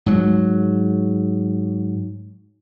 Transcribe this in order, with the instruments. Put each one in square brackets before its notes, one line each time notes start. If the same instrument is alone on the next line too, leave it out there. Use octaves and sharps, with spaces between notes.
[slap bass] G#2 F#3